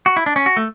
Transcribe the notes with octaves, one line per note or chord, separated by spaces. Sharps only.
F#4
E4
D4
C#4
F#4
A3